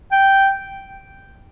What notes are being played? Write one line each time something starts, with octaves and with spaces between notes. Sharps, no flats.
G5